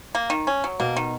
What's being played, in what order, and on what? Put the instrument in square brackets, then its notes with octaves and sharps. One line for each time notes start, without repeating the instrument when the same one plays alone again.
[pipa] A#3
D#3
C#4
F#3
[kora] B2 [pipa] A#3
[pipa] D#3